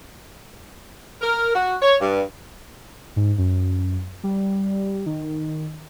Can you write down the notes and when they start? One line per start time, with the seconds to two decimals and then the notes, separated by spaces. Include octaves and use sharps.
1.22 A#4
1.55 F#4
1.82 C#5
2.01 G2
3.16 G#2
3.38 F#2
4.23 G3
5.06 D#3